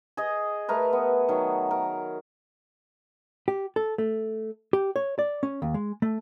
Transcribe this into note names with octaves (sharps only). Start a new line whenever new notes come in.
G#4 D#5
A3 A#4 B4
B3
D#3 F#3
A#4
G4
A4
A3
G4
C#5
D5
C#4
D#2
G#3
A3